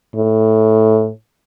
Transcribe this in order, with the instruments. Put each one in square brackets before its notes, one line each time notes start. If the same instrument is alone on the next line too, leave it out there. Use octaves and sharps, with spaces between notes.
[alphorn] A2